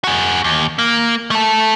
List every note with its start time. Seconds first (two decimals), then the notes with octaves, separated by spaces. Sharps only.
0.04 F#4 G#4
0.44 D#2
0.78 A#3
1.31 A3 A4